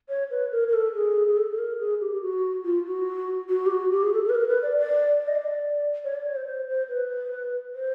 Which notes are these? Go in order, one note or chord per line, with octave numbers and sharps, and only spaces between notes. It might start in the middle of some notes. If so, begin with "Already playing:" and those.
C#5
B4
A#4
A#4
A4
G#4
G#4
A4
A4
A#4
G#4
G4
G4
F#4
F4
F#4
F#4
G4
F#4
G4
G#4
A4
A4
B4
A#4
B4
D5
D5
D5
D#5
D5
C#5
D5
C#5
C5
C5
C5
B4
C5